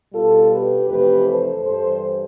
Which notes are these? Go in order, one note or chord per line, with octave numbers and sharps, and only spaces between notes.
B2 G3 F4 A4
G4 B4
F2 C3 E3 A3 G4 B4
A4 C5
G2 E3 G3 A4 C5